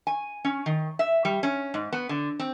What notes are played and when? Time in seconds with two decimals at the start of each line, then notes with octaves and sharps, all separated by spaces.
0.07 G#5
0.45 C#4
0.66 D#3
0.99 E5
1.25 G3
1.43 C#4
1.74 G#2
1.93 B3
2.09 D3
2.39 C4